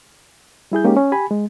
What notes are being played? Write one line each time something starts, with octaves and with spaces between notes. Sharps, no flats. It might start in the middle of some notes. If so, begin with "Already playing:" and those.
G3 E4 G#4 G6
G#3 A#3 C#4 D#4 G4
C#4
G4 G#5 B5
G#3